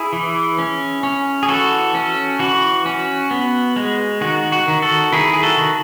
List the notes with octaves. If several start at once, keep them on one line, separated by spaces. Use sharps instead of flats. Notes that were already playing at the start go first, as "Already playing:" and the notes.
Already playing: E4 G#4
E3
C#4
C#4
G#4
E3 F#4 A4
C#4
E3 F#4
C#4
B3
G#3
D#3 F#4
F#4
D#3
F#4 A4
D#3 E4 G#4
G#4
F#4 A4
D#3